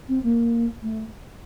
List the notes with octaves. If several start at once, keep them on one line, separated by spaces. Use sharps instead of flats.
C4
A#3
A3